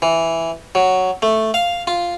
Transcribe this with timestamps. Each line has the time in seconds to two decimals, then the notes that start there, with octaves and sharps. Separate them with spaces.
0.02 E3
0.75 F#3
1.22 A3
1.54 F5
1.87 F4